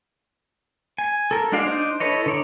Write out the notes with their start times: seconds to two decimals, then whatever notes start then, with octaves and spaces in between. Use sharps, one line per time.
0.98 G#5
1.31 A4 A#4
1.52 G#3 D4 F#4 D5 F5
1.66 D4 D#4 C5 D5
2.00 E4 A4 B4 C#5 D#5
2.26 D3 D#4 C#5 D5